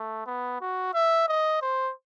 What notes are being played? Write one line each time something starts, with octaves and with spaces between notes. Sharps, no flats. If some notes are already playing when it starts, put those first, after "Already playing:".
Already playing: A3
B3
F#4
E5
D#5
C5